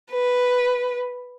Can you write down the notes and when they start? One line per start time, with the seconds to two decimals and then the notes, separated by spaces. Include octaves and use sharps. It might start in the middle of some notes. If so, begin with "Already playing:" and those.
0.11 B4